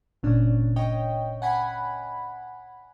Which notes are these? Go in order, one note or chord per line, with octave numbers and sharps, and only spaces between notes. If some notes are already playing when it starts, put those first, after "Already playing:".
G1 C#2 A#2 C#4 D4
C#5 D#5 G5
F#5 G#5 B5